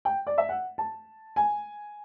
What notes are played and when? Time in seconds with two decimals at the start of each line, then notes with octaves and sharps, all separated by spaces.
0.05 G5
0.27 D5
0.38 E5
0.49 F#5
0.78 A5
1.36 G#5